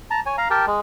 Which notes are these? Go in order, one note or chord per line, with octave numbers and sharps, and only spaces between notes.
A5 A#5
C#5 G#5
F5 A#5
G4 A#4 G5 A5
G#3